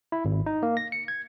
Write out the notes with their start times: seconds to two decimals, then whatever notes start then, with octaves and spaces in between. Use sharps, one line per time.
0.12 E4
0.25 G#1
0.46 D#4
0.63 A#3
0.77 A#6
0.92 C#7
1.08 G#6